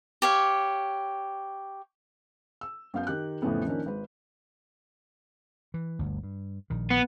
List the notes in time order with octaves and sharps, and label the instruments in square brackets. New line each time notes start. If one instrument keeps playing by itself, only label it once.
[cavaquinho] G4 C#5 F5
[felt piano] E6
F#2 B3 F5 G6
D#3 G4 F#6
F2 A2 C#3 E3 A3 B3
D#3 F3 A#3 C#4 D4
G#1 B4
[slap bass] E3
G1 D2
G2
A#1 D#3
[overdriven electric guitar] B3